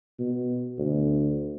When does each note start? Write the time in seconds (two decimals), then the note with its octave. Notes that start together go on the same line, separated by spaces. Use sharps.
0.19 B2
0.79 D2